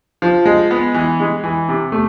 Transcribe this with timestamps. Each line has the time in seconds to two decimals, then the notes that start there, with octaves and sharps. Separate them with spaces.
0.22 F3
0.45 G#3
0.71 B3
0.94 E3
1.20 G#3
1.44 E3
1.69 C3
1.92 A3